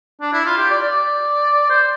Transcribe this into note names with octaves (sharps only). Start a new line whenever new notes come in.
D4
E4
F4
G4
D5
D5
C5